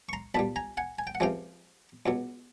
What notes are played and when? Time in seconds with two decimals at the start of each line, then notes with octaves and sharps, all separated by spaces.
0.09 C#6
0.13 A#5 C6
0.34 B1 A#2 G3 A5 B5
0.56 G#5 A#5
0.77 F#5 G#5
0.99 G#5
1.07 G5
1.15 F#5
1.20 C#2 C3 F3 G#3 F5 G5
2.06 C#2 B2 F#3